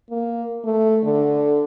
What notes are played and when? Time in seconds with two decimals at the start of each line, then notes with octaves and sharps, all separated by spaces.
0.10 A#3
0.64 A3
1.04 D3